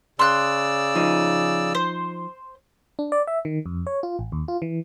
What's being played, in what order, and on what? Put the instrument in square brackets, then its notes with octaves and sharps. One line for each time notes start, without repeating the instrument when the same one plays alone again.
[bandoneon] C#3 D5 E6 [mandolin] C6 F#6
[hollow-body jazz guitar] F3 D#4
[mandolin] C5
[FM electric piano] D4
D5
E5
D#3
F2
C#5
F4
A1
D#2
F4
E3